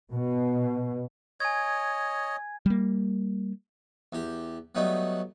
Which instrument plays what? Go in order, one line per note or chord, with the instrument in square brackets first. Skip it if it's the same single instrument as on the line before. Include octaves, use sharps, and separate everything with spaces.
[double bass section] B2
[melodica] C#5 D#5 [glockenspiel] G#5 G#6
[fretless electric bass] G3 A#3
[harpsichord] E2 G4
F#3 G3 A3 B3 D#4